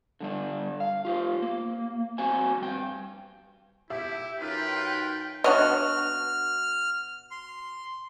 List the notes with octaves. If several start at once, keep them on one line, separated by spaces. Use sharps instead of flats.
D3 G3 D4
F5
F4 G4 C5
A#3
C4 F#4 C5 G#5
G2 G5
E4 G4 E5
F#2 D#4 F4 B4 G5
B2 D4 F#4 C#5 D#5 F6
C6